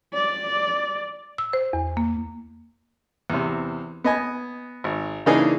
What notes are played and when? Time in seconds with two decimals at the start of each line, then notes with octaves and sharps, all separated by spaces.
0.14 D5
1.38 E6
1.53 C5
1.73 E2
1.97 A#3
3.30 E2 C3
4.04 B3 D#5 G#5
4.84 G#1
5.26 C#3 E3 A#3 D4 D#4 G#4